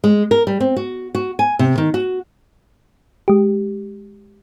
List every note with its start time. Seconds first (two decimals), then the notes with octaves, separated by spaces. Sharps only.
0.04 G#3
0.31 A#4
0.47 G3
0.60 C4
0.76 F#4
1.15 F#4
1.39 G#5
1.59 C3
1.78 D#3
1.94 F#4
3.28 G#3 G4